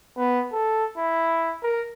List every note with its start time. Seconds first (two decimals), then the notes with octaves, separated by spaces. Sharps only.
0.17 B3
0.52 A4
0.97 E4
1.62 A#4